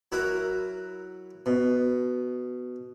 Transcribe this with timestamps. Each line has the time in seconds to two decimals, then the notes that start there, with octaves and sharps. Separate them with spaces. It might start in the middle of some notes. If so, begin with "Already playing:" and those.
0.12 F#3 E4 F#4 A#4
1.46 B2